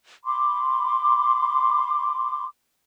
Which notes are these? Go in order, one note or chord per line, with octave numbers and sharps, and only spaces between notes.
B5 C6 D6